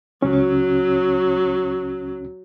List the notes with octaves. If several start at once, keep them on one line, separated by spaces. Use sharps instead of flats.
C#2 F#3 C#4